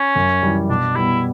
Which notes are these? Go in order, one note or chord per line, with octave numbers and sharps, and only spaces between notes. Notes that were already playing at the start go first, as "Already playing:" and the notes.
Already playing: C#4
F#2
E3 G3
B2 D4
G3 B3 E4